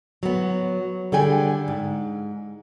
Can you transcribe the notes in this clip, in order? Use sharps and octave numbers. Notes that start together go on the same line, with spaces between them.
F#3 B3
D3 G3 G#4 G5 G#5
G#2